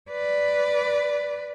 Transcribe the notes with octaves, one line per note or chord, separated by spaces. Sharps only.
B4 D5